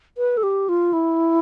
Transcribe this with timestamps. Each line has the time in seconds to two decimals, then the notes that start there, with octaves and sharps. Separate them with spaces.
0.18 B4
0.37 A4
0.43 G4
0.69 F4
0.93 E4